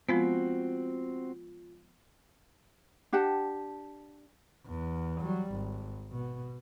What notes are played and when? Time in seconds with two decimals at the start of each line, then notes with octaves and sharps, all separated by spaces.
0.09 F3 G#3 B3 C4 F4 F#4
3.13 D4 G4 F#5 A5
4.66 E2
5.21 F#3 G3
5.52 G#1
6.11 B2